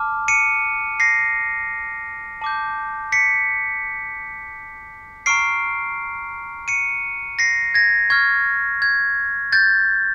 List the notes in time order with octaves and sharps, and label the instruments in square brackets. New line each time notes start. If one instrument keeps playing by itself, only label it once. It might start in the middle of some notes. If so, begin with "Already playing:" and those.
Already playing: [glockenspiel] A5 D6 F6
C#7 D#7
A#6 C7
A5 D6 G6
B6 C#7
A#5 C#6 F6 C7 D7
C#7 D#7
A#6 C7
G#6 A#6
C#6 F6 G#6
G#6
G6 A6